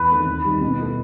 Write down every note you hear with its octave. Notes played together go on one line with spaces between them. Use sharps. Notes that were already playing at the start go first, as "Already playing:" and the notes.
Already playing: E2 B4
D#3 A3 C4
D#2
D#3 G3 D#4 G4
B2
A3 E4